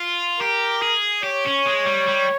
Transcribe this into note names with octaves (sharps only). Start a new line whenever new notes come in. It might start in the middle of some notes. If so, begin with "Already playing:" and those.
Already playing: F4
G4 A#4
G#4
G4 C#5
C#4
G#3
G3
G3